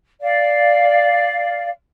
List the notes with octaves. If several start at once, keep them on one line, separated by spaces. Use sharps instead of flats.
D5 F5